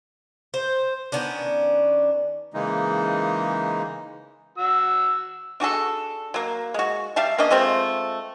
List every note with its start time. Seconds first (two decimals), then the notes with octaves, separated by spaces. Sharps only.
0.54 C5
1.12 D#3 B3 C#4 D4
2.54 C#3 E3 G#3 A#3 D#4
4.58 F#4 E6
5.60 D4 F#4 G#4 A4
6.34 F#3 A#3
6.74 G#3 F#4
7.16 G3 E5 F5 A5
7.38 A#3 C#4 D4 D#5
7.50 G#3 A3 C4 F4